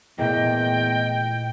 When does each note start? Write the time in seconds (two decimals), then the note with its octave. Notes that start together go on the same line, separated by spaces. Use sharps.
0.18 E2 A#2 A3 A#3 D#5 G5